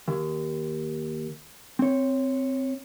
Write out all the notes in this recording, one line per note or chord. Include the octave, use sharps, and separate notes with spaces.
D#2
C4 C#5